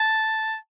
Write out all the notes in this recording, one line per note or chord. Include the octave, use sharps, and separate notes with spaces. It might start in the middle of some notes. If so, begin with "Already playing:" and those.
Already playing: A5